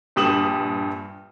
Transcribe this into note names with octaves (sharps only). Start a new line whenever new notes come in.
A#1 G2 G4 D#6 E7 F#7